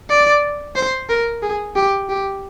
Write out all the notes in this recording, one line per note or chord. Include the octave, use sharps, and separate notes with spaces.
D5
C5
A#4
G#4
G4
G4